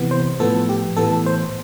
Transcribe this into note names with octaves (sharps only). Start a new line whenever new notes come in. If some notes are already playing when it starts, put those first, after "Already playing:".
Already playing: C3 E3 B3
C5
A2 F3 B3 A4
G4
A2 E3 B3 A4
C5